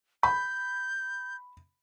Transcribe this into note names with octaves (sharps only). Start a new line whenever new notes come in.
B5 G6